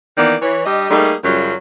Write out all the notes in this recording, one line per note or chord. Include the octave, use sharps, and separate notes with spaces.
D#3 E3 A#3 B3 D5
E3 C#5
G3 D4 G4 D#5
G3 A3 A#3 D#4 G#4
F#2 C#3 F#3 G3 F4